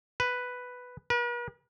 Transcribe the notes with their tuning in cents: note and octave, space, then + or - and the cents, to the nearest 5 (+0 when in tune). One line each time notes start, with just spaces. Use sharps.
B4 +5
B4 -45